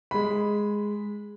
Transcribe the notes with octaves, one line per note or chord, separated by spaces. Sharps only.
G#3 B5